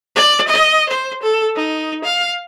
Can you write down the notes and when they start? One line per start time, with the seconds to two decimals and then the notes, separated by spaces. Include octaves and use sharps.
0.16 D5
0.48 D#5
0.89 C5
1.23 A4
1.56 D#4
2.04 F5